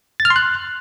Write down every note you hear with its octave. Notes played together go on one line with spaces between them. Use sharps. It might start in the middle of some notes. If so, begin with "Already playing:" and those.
A6
F6
C6
F#6